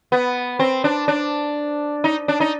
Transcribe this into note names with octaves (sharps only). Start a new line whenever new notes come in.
B3
C4
D4
D4
D#4
D4
D#4